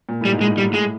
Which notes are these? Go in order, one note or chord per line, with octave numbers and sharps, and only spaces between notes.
A#2
A2 G3
G#2
G#3
A2
G3
G#2
A2 G#3